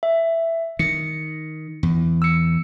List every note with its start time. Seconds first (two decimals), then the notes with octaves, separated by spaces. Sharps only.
0.03 E5
0.79 D#3 C#7
1.83 E2
2.22 E6 C#7